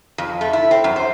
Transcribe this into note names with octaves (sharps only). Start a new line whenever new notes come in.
F2
A3
E4
C4
F#2
C5